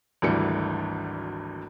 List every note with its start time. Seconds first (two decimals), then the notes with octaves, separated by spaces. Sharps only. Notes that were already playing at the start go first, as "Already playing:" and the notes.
0.22 G#1 D2 D3 E3 G3 C#7